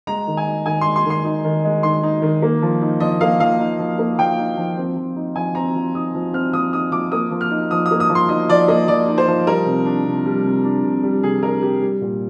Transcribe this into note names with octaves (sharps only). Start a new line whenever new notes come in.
G#3 A#5
D#3
G#5
D#4
D#3 G#5
C6
G#3
C6
D#3
C6
D#4
D#3
G#3
D#3 C6
D#4
D#3
A#3
F3
D#4
F3 D#5
A#3 F5
F3 F5
D#4
F3
A#3
F3 G5
D#4
F3
C4
F3
D#4
F3 G#5
C4 A#5
F3
D#4 D#6
F3
C4 F6
F3 D#6
D#4 D#6
F3 D6
A#3 D#6
F3
F6
D#4
F3 D#6
D#6
A#3
D#6
F3
C6
D#4 D#5
F3 D5
A#3 D#5
F3 D5
D#4
C5
F3
G3 A#4
C3
D4
C3
G3
C3
D4
C3
G3
C3 G#4
D4 A#4
C3 G4
G3
A#2